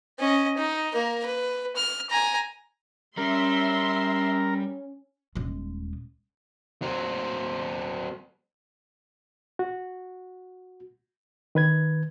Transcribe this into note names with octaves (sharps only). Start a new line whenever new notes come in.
C#4 D#5
D#4
A#3 A#4
B4
F6
G#5 A#5
G3 C#4 A#4 E5 C6
D#1 G#3
F#3 C4
F#4
D#3 B4 G#6